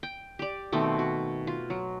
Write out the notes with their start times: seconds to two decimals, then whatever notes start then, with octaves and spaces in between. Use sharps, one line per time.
0.03 G5
0.39 G4 D5
0.72 B2 D#3 A3 C4
0.99 F#4
1.47 F4
1.70 F#3